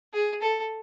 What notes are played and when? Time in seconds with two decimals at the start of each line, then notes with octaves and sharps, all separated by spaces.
0.13 G#4
0.42 A4